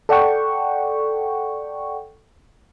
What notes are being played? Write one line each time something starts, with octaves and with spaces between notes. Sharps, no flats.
A4 D5 F#5 G5 C#6